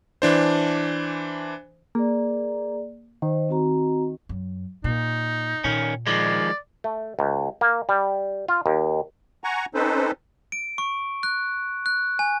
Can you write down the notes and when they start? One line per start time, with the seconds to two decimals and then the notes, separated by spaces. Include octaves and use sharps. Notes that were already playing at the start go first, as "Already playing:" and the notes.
0.22 E3 D4 C5
1.95 A#3 G#4 D5
3.22 D#3 C5
3.49 C4 F#4 A#5
4.29 F#2
4.84 A#2 D#4
5.64 A#2 D#3 C#4
6.07 D#3 F3 G#3 D5
6.84 A3
7.19 C#2
7.61 A#3
7.89 G3
8.48 F4
8.66 D#2
9.44 F#5 G#5 A#5 C#6
9.74 C4 C#4 D#4 A4 B4 C5
10.52 D7
10.78 C#6
11.23 F#6
11.86 F#6
12.19 G#5